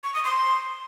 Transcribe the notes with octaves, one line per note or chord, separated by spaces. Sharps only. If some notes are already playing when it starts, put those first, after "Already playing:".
C#6
D#6
C6